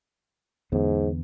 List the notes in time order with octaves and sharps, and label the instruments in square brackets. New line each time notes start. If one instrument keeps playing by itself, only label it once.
[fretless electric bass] E2 D3 B3 [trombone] G#2